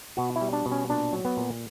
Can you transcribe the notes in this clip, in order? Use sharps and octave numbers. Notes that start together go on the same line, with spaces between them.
B2 F#4
E4
G3
D4
B2
C#4
A#2 D4
F#3
B3
A#2